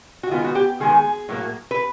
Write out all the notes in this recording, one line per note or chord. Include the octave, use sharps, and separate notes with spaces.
F#4
D#3 G#3 B3 F4
F#4
G4
D#3 G#3 B3 G#4
A2 F#3 A#3
B4